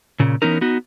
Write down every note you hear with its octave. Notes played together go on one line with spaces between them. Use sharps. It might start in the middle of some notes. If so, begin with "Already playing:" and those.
A#2 C#3
E3 B3 C#4 D#4 A#4
B3 D#4 F#4